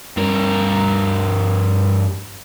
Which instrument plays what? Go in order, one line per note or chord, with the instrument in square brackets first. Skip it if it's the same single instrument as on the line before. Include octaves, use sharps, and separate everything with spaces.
[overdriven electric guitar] G2 A#4